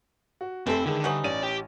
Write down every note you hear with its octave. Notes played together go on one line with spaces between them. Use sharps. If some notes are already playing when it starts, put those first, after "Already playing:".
F#4
F1 E3 A3 C4 E4 A4
D3 D#3 G#3
E3 F#3 G3 D#4 F#7
A1 C#4 D5 D#7
G4